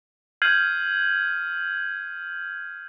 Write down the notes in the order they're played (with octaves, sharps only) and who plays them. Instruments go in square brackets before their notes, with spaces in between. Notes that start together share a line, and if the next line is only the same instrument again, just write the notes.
[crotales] F6 G6 G#6 C7 D#7 F#7